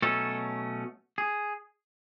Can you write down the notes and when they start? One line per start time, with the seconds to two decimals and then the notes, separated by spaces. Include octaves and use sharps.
0.02 B2 F#3 A3 C#4 A4
1.18 G#4